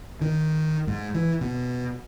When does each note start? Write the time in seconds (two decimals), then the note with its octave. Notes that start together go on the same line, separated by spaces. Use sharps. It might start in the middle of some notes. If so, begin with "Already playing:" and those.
0.21 D#3
0.87 G#2
1.14 E3
1.41 B2